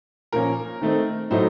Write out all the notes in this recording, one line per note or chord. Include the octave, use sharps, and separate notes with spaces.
A#2 F3 A#3 C#4 A#4
D#3 A3 C4 D#4
A2 F#3 A3 D#4 C5